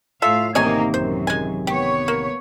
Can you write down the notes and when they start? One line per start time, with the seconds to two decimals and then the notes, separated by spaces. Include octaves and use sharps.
0.22 A2 F4 A4 E5 F5
0.55 A1 C3 D#3 A#3 D#4 C#5 D#5 G#5
0.94 F#2 C5
1.27 G#3 G#5
1.67 B3 G4 C#5
2.08 A#3